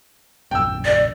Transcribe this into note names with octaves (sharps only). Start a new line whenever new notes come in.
D#1 A#1 F#2 G5 E6
D5